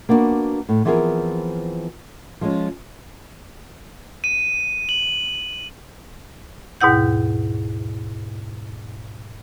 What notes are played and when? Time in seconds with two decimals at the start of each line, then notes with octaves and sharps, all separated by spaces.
0.09 A#3 B3 D4 D#4 F#4
0.69 A2
0.85 E3 F3 B3 C4 G#4 A#4
2.41 F3 G#3 C#4
4.24 D#7
4.89 F#7
6.81 D#2 G#2 B2 E4 F#5 G6